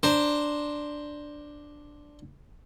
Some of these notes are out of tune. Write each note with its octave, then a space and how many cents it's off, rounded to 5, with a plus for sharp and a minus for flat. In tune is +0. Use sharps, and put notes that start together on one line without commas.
D4 +0 C5 +0 A#5 +0